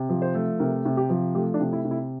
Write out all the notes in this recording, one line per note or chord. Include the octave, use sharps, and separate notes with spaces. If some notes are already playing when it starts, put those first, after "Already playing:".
Already playing: C3
F3
C5
A3
C3 A#4
C3
G4
F3
A3 G4
D4
C3
E4
C3
E4